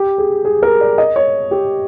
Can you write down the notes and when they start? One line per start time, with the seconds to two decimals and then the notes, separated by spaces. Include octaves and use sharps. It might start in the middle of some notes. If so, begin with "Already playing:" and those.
Already playing: G4
0.18 G#4
0.45 G#4
0.63 A#4
0.81 D5
0.98 D#5
1.16 C#5
1.51 G4